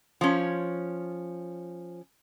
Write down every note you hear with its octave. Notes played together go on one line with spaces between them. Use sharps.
F3 C#4